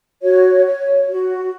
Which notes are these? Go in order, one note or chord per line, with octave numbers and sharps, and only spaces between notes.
F#4 C#5
C#5
F#4